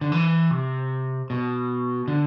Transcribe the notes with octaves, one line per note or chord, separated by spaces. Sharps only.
D3
E3
C3
B2
D3